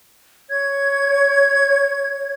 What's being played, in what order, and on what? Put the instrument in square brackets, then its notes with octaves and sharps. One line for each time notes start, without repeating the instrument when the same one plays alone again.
[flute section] C#5 G#6